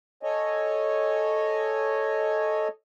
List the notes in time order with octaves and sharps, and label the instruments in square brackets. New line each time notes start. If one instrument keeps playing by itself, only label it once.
[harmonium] A4 C#5 D#5 G#5